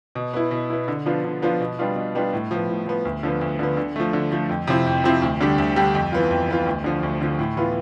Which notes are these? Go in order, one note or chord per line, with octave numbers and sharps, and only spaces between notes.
B2
B3 E4
B2
B3 E4
D3
F3 B3 D4 F4
D3
F3 B3 D4 F4
B2
G3 B3 D4 F4
B2
G3 B3 D4 F4
A2
F3 B3
A2
F3 B3
D2
D3 F3 B3
D2
D3 F3 B3
D3
F3 A3
D3
F3 A3
F2
C3 F3 C4 E4
F2
C3 F3 C4 E4
D2
D3 G3 D4 G4
D2
D3 G3 D4 G4
F2
E3 B3 F4
F2
E3 B3 F4
D2
D3 F3
D2
D3 F3
A2
E3 B3 F4